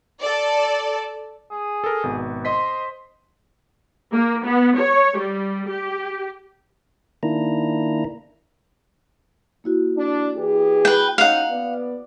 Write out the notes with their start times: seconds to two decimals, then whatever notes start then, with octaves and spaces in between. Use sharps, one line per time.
0.20 A4 D5
1.51 G#4
1.84 A4 A#4
2.03 G#1 B2
2.45 C5 D#5 C6 B6
4.14 A#3
4.45 B3
4.78 C#5
5.18 G3
5.70 G4
7.23 D#3 A#3 D4 E4 A#5
9.64 A#3 E4 F#4
9.97 D4
10.37 E3 G4 G#4
10.85 B4 G5
11.18 C#4 D#4 F5 F#5
11.50 B3 D5